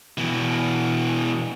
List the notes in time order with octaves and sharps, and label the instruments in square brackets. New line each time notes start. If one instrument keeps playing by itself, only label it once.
[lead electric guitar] B2 E3